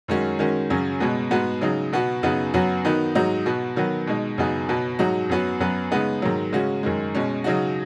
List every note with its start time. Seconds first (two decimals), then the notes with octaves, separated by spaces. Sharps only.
0.08 F#2 D#3 G#3 C#4 F#4
0.39 D#3 G#3 C#4 F#4
0.70 F#2 C#3 F#3 C#4
1.00 B2 G#3 B3
1.31 G#2 G#3 B3 F#4
1.61 C#3 F#3 D#4
1.93 B2 B3 F#4
2.23 F#2 C#3 B3 D#4 F#4
2.54 F#2 F#3 B3 F#4
2.85 D#3 B3 D#4 F#4
3.15 G#2 F#3 D#4 F#4
3.46 B2 B3 F#4
3.76 D#3 F#3 B3
4.07 B2 G#3 D#4
4.38 F#2 C#3 B3 D#4 F#4
4.69 B2 B3 F#4
4.99 G#2 F#3 D#4 F#4
5.29 F#2 F#3 B3 F#4
5.60 F#2 F#3 B3
5.91 C#3 G#3 B3 D#4
6.22 G#2 D#3 F#3
6.53 C#3 G#3 C#4 F#4
6.83 F#2 D#3 G#3
7.15 B2 G#3 C#4
7.44 C#3 F#3 D#4 F#4